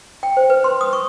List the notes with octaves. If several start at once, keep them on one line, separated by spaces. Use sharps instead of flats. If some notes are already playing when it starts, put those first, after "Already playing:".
G5
C5
B4
C6
D#6
C#6